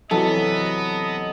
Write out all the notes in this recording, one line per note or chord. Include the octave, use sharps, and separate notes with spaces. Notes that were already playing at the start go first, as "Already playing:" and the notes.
C3 E3 F#3 B3 A4 D#5